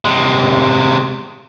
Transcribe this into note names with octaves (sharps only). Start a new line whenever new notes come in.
C3 G#3